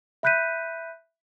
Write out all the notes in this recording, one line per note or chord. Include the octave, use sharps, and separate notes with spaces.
E5 B5 F#6 G6 B6 D#7